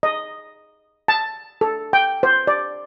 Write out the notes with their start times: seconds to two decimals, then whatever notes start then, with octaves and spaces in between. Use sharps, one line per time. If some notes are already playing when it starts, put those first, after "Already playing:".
0.03 D#5
1.08 A5
1.61 A4
1.93 G5
2.23 C5
2.47 D5